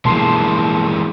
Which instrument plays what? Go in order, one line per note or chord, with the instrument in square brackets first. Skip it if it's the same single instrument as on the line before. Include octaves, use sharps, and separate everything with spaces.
[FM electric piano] B2 C6 [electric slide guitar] E3 G#3 A#3 [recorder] A5